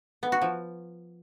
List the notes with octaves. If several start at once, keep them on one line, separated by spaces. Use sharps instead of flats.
B3
F#4
F3